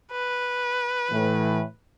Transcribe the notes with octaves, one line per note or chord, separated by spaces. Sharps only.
B4
A2 E3